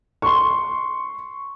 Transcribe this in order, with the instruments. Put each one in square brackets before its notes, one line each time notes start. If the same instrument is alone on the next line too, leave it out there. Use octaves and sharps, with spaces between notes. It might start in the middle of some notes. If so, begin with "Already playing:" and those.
[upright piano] C6 C#6